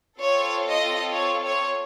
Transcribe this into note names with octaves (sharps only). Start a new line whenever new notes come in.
C4 F4 A4 C#5
D#5
C#5
C#5